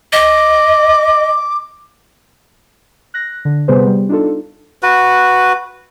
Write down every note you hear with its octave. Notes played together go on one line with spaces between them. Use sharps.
D#5 D6
F#6 A#6
D3
C3 G3 B3 G#4 B4 C5
G3
D4 D#4 F4 A4
F#4 B4